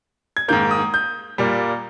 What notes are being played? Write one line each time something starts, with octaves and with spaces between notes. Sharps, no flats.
G#6
G#2 D#3 A#3 G6
D#6
G6
A#2 G3 A#3